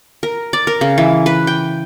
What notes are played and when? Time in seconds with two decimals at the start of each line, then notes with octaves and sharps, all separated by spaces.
0.23 A#4
0.53 D5
0.67 A#4
0.81 C#3
0.98 E3
1.26 B4
1.47 G5